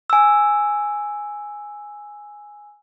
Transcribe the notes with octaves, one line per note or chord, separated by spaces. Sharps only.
G#5 E6